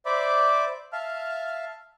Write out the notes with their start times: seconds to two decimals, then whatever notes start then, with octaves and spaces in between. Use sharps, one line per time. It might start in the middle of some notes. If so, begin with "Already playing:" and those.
0.06 C5 D5 E5 B5 D6
0.93 E5 F5 A5 F6